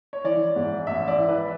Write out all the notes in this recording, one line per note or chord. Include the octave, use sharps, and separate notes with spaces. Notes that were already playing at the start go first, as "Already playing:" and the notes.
C#5
E3 D5
G#2
A1 E5
D5
E3
B4